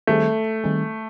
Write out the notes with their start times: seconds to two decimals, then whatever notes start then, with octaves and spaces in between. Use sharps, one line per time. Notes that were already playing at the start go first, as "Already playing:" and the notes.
0.07 D#3 G3 A3 C4 D#4 G#4
0.64 D#3 G3 C4 D#4 G#4